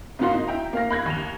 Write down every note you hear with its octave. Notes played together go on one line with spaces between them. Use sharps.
G#2 C#3 A#3 F4 F#4 C6
D#4
E4 G5 A#5
A#3 F5 A#6
B5 F#6 G#6 A#6
D#2 F7